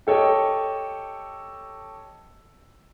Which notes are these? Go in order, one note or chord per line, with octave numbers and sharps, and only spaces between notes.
G4 A4 C#5 D#5 G5